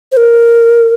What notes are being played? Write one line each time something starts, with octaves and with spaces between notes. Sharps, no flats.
C5
A#4